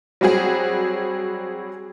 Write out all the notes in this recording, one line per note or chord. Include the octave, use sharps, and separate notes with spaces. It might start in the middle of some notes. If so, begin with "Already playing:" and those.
F#3 G3 C4 F#4 G#4